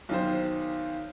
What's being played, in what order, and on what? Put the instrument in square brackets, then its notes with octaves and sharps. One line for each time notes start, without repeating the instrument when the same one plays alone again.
[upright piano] B1 D#3 C5